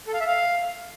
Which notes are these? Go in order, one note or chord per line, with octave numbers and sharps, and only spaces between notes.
A4
F5
E5
F5